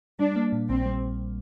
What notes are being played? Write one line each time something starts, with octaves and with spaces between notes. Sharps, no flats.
G3 D4
A#3
A#2
A#1 C4
G3